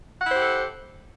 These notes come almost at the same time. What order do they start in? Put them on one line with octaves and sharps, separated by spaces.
F#5 E4 C5 G4 A4